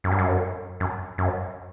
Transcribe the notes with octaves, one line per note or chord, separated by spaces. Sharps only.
F#2
G2
F#2
F#2
F#2